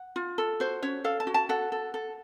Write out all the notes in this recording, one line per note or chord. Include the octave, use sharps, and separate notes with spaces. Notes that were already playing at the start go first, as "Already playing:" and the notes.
Already playing: F#5
F4
A4
F#4 C5
C#4 C#5
A4 F5
A5
F#4
A5
A4 F#5
A4
A4